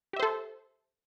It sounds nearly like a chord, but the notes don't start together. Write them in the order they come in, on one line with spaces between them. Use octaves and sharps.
G4 E5 C5 A4